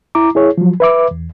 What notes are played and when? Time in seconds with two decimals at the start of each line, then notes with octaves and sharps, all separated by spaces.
0.15 E4 A#5 D6
0.35 E4 G#4 C#5
0.58 F3 F#3
0.80 B4 E5 D6
1.11 E2